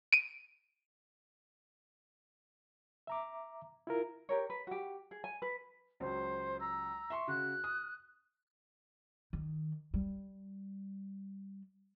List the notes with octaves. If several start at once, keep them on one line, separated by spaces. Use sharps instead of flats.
D7 D#7
E5 A#5 D6
E4 F4 A#4
G4 A#4 C#5
B4
F#4 G4
G#4
G#5
B4
C#2 F#3 C5
A#5 E6
E5 C6 C#6
C#3 F#4 F#6
D#6
D#3
G3